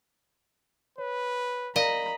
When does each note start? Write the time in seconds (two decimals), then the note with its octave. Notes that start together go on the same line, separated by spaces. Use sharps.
0.98 B4 C#5
1.76 A#4 D5 D#5 F5 A#5 B5